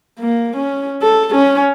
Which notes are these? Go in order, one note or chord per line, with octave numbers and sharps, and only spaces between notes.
A#3
C#4
A4
C#4